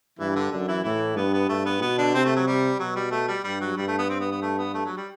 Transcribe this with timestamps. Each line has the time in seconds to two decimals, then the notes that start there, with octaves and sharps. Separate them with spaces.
0.19 G2 E3 E4
0.35 D3 D4
0.52 F#2 D3 D4
0.68 E3 E4
0.84 A2 E3 E4
1.16 G2 B3
1.34 B3
1.49 G2 A3
1.66 B3
1.82 B2 B3
1.98 D3 D4
2.14 C3 C4
2.25 A3
2.36 F#3
2.47 G3
2.80 B2 F#3
2.96 G3
3.11 A3
3.28 G3
3.44 G2 G3
3.61 F#3
3.77 G2 G3
3.88 A3
3.99 B3
4.10 C4
4.20 B3
4.31 B3
4.42 A3
4.58 B3
4.74 A3
4.86 F#3
4.97 G3